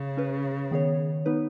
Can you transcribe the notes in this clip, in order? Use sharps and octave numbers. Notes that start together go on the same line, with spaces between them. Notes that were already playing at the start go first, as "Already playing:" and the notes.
Already playing: C#3
C#4 B4
D#3 B3 G#4 C#5
B3 D#4 B4